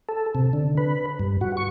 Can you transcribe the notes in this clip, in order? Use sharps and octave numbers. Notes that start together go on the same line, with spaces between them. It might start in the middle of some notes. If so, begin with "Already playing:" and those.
A4
C3
D3
B4
G2
F#4
C#6